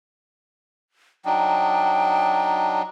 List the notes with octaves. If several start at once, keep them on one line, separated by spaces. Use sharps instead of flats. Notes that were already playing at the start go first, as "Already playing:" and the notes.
F#3 D4 D#4 G5